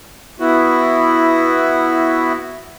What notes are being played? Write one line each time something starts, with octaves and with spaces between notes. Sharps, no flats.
B3 E4 F#4